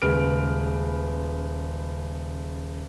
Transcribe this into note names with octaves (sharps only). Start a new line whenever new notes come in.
D#1 C#3 G#3 B4 F6 D7